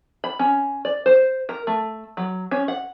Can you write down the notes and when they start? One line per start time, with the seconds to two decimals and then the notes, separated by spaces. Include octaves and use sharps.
0.24 B5
0.39 C#4
0.85 D5
1.06 C5
1.49 A#4
1.67 A3
2.17 F#3
2.51 C#4
2.68 F#5